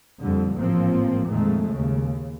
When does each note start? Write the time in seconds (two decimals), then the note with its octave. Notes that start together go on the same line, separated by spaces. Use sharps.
0.22 F2 A#2 D3 G3
0.57 A1 G#2 F3 A#3 C4
1.28 F2 A#2 D#3 G#3 A3
1.69 D#2 C#3